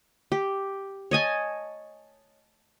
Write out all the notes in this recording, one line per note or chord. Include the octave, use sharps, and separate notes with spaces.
G4
C#5 D#5 G#5 A5